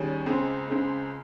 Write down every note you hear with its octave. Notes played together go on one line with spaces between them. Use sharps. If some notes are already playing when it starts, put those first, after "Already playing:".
Already playing: D#2 D#3 G3 C#4 G#4
C#2 C#3 G#3 C4
C#2 C#3 G#3 C4